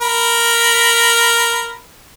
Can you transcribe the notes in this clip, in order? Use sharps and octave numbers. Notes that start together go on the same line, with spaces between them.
A#4 B5